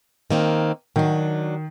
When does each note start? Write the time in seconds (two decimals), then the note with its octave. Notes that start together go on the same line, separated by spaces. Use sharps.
0.31 D#3 A#3 C4
0.96 D#3 F#3 D4